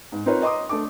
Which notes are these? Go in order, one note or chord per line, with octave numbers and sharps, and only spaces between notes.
G#2
C4 D#4 F4 A#4 B4 C#5
D#5 A#5 C6 D6 D#6
A3 D4 D6